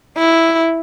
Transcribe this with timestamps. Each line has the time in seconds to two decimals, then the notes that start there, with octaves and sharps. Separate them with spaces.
0.17 E4